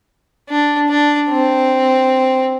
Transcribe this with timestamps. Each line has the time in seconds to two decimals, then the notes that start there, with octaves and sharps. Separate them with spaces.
0.49 D4
0.89 D4
1.30 C4